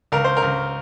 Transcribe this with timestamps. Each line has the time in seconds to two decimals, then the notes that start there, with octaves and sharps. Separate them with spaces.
0.12 C#2 A#4
0.24 C5
0.37 A#4
0.42 C#2